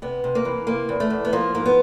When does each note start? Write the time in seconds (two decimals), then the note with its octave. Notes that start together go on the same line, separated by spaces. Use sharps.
0.02 C3 B3
0.24 C3
0.35 A#3
0.45 E3
0.67 C3 A#3
0.89 E2
1.00 A3
1.10 E2
1.25 B3
1.33 F3 A#3
1.55 G#2 A#3
1.66 B3